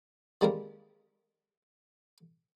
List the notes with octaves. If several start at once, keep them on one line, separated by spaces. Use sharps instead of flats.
D#3 G3 G#3 A#3 C4 A#4